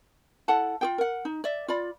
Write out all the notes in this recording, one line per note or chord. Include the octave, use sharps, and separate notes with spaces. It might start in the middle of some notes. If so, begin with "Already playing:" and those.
E4 A4 F#5 A5
F4 G#4 G5
A#4 F#5
D#4
D5 E5
F4 D5 B5